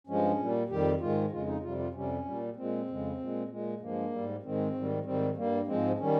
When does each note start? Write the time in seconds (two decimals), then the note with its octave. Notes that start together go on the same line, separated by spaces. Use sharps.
0.07 G2 F3 G#3 C#4
0.39 A#2 G3
0.69 F2 D#3 G3 G4
1.01 G#2 D#3 G#3 F4
1.31 F2 C#3 G#3 F4
1.47 D#4
1.62 F2 C3 G3 F4
1.79 F4
1.93 F2 C3 G3 C#4
2.25 A#2 G3
2.56 A#2 G#3 C4
2.87 F2 C#3 G#3
3.19 A#2 G#3
3.49 A#2 G#3
3.80 G2 F3 G#3 A#3
4.11 G#2 G3
4.43 G#2 D#3 G#3 C4
4.75 G#2 D#3 G3
5.04 G#2 D#3 G3 C4
5.37 G2 G3 A#3
5.67 G#2 F3 G#3 C4
5.99 D#3 G3 C#4